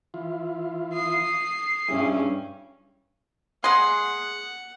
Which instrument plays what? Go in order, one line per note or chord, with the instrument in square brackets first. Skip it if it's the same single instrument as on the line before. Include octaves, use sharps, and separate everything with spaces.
[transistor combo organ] E3 F4
[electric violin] D#6 C7
[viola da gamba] G2 C#4 [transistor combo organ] G3 E4 G#4
[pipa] G#3 G#4 [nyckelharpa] F#5 [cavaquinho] C6